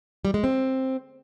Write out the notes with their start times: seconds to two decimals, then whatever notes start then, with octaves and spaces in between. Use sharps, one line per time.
0.25 G3
0.34 G#3
0.44 C4